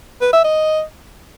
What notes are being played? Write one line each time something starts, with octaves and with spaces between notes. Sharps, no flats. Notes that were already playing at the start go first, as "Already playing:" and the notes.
B4
E5
D#5